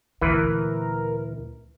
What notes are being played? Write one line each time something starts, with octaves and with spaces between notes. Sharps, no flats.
D2 A#2 E3 A#4 B4